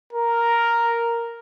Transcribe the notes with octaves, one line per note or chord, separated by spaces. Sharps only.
A#4